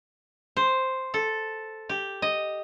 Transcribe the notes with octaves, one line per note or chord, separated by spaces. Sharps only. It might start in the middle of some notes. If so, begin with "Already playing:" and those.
C5
A4
G4
D#5